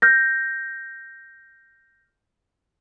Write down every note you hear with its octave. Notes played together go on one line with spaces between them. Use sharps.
F6 G6 A#6